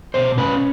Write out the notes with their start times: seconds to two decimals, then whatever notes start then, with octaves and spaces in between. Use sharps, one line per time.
0.14 B2 C5
0.38 C#4 B4